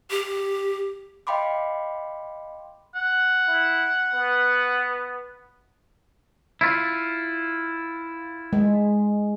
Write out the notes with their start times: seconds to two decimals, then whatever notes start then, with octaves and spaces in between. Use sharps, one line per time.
0.11 G4
1.27 D#5 F5 G5 B5 C6 D6
2.95 F#5
3.47 E4
4.14 B3
6.61 E4 F4
8.53 G#3